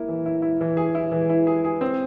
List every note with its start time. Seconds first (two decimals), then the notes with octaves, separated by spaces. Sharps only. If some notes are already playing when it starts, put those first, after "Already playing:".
Already playing: A#3 E4
0.08 E3
0.26 E4
0.42 E4
0.61 E3
0.77 G#4
0.95 E4
1.12 E3
1.30 E4
1.47 G#4
1.65 G#4
1.81 C4